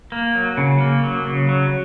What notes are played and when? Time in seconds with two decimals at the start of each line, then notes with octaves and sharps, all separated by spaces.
0.12 A#3
0.35 F#3
0.57 C#3
0.80 A#3
1.04 F#3
1.27 C#3
1.49 F#3